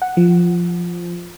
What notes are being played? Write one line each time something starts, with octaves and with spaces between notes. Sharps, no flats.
F#5
F3